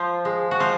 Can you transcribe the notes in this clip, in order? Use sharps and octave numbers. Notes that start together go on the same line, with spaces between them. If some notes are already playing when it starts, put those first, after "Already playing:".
Already playing: F3 F4
G#3
F#4
F3 F4